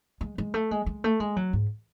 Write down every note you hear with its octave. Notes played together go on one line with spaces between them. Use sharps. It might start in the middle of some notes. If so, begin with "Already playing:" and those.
G#3
G#3
A3
G#3
G#3
A3
G#3
F#3
G#2